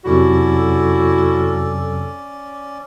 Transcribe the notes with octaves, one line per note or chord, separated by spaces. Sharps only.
F2 C3 F#3 C#4 E4 F#4 A4 D5